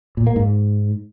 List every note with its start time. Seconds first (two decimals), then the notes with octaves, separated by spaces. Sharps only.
0.17 A#2
0.27 A#3
0.36 G#2